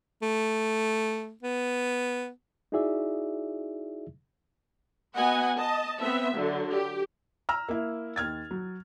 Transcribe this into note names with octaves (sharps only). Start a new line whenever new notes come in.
A3
B3
D#4 E4 F#4 G#4 D5 E5
B3 F#4 D#5 F#5 G#5
D#5 A5
B3 C4 E5
D3 F#3
G4
A#5 E6 F6
A#3 E4
D#2 F6 G#6 A6
F#3